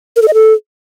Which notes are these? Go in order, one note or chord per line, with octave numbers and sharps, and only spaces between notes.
A#4
A4
D#5
A4